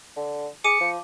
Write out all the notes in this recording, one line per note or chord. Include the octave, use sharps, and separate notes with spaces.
D3
G#4 D6 C#7 D#7
F3